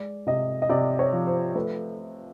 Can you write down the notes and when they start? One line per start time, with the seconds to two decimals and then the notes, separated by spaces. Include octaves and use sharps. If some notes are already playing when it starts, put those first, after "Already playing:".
Already playing: G#3 D5
0.27 C3 D#5
0.62 D#5
0.69 C3 D5
0.99 C#5
1.12 F3
1.27 C5
1.55 A3 B4